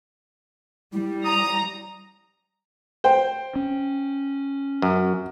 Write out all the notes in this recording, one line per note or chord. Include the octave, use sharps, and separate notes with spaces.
G3 E4
A#5 D#6
C5 G5
C#4
F#2